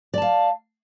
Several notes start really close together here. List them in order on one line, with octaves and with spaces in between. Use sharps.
D5 A5 F5